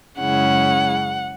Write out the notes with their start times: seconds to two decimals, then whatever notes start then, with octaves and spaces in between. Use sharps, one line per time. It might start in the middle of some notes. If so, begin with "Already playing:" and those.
0.20 F#2 C#3 G#3 C#4 E4 F#5